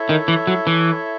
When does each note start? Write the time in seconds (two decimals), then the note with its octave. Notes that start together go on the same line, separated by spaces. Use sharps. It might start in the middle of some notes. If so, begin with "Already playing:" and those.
Already playing: E4 A4 C#5 E5
0.09 D#3
0.28 E3
0.47 F#3
0.67 E3